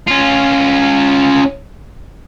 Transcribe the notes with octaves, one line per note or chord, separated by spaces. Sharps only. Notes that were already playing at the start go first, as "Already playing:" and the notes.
C#4 F4